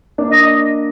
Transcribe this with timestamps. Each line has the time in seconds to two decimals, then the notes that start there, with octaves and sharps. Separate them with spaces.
0.18 A#3 D4
0.32 D#5